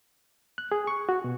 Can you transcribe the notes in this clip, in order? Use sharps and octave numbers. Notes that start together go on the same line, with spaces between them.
F#6
G#4
C#6
F#4
B2